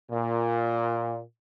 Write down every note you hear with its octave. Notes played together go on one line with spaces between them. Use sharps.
A#2